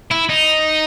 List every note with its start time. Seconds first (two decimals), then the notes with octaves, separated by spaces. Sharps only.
0.11 E4
0.29 D#4